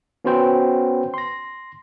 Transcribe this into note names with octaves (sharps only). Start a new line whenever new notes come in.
B3 C#4 F#4 B4 C5 G5
C6 A#6